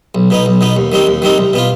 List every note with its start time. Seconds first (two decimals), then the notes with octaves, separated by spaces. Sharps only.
0.15 B1
0.30 B2 B3 D#4
0.46 B1
0.61 B2 B3 D#4
0.76 D#2
0.92 D#3 G3 C4 D#4
1.07 D#2
1.22 D#3 G3 C4 D#4
1.38 C2
1.53 B2 B3 F4